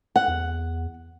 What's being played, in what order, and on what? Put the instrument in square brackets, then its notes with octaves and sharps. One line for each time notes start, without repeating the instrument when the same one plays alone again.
[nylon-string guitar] F#5
[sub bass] E2